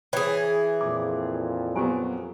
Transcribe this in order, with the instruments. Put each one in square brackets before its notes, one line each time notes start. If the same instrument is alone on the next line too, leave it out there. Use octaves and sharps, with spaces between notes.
[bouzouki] E3 G#4 [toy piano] C5 C#5 G5
[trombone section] F2 A#2 [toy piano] D6
[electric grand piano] F#3 A#3 B3 [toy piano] G4 C5 G#5